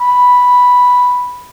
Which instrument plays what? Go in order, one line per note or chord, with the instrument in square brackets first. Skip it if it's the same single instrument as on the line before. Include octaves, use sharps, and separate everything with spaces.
[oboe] B5